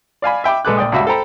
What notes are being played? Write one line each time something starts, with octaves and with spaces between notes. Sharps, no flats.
D5 F5 G#5 B5
E5 G5 B5 D6
A#1 G#3 A4 B4 D6 F#6
A#1 D5 G5 D#6
C#2 G2 F#4 E5 B5 E6
A4 C5 G5 A#5 B5